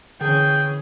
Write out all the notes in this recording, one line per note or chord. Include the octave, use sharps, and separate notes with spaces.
D3 E3 C#4 G#4 G5